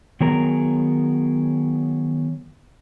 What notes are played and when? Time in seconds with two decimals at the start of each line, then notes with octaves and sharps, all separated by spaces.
0.21 D#3 F#3 B3 G#4 A#4 A#5